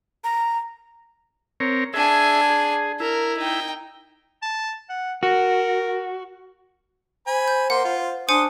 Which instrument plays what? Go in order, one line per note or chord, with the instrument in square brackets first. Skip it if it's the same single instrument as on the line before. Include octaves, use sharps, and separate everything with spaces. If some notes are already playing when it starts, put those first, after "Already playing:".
[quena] A#5
[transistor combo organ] C4 A#4 C#5
[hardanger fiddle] D4 G#5 [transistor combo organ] G#4 E5
[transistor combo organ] G#4
[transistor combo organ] E4 [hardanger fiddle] A#4
[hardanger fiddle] D#4 G5
[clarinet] A5
F#5
[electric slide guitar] F#4 [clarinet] A#4
[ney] C5 [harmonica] G#5 B5
[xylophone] G6
[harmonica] A#3 C6 [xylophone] F#5
[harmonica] F4
[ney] D4 [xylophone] C5 G#5 C#7 [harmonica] C6 D#6